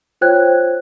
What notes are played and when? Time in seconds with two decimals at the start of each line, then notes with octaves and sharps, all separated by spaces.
0.21 F4 C5 C#5 G5 F#6 G#6